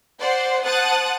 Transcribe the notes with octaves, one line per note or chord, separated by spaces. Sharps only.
C5 D5 F#5 C6
C5 F#5 A5 D#6 F#6 A6